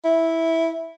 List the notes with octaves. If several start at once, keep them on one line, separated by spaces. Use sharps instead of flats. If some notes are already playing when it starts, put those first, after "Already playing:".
E4